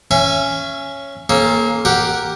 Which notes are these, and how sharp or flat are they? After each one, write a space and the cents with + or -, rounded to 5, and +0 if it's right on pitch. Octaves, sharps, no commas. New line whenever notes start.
C#4 +0 E5 +35 G#5 +0
A#3 +0 C#4 -30 A4 -45
G4 +0 A#4 +0 F#5 +0